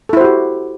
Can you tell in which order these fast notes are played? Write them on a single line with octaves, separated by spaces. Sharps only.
A4 E4 C5 F#4 G4